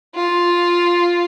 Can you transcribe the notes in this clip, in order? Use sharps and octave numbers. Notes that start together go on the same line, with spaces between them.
F4